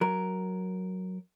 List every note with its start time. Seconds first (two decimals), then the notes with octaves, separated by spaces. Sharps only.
0.01 F#3 A#4